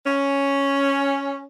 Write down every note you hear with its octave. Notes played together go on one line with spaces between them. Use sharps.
C#4